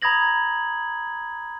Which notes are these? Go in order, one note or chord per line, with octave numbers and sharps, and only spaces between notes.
A#5 B5 D#6 G#6 A#6 F#7